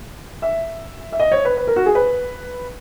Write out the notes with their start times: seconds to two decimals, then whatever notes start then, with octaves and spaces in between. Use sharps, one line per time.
0.42 E5
1.12 E5
1.20 D#5
1.32 C#5
1.45 B4
1.57 B4
1.67 A#4
1.76 F#4
1.86 G#4
1.95 B4